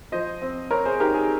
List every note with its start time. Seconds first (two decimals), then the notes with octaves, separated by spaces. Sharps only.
0.12 F3 C5 D#5
0.42 C4
0.71 C4 A#4 C#5
0.85 G#4 C5
1.00 D#4 G4 A#4
1.14 G#4